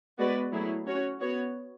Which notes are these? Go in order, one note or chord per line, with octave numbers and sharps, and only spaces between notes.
G#3 B3 F#4 B4 D5
F#3 A3 E4 G#4
C#4 F#4 C#5
B3 F#4 C#5